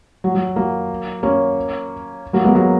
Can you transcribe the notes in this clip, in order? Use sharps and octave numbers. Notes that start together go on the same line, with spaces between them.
F#3
F#3
F#3 A#3
A#3 C#4
F#3 A#3
G#3 B3
F#3 A#3